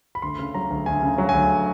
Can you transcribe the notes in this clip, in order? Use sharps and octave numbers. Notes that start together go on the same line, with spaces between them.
B5
D2 C6
C#3
F#3 A#5
D2
D2 G#5
C#3
F#3
D2 G#5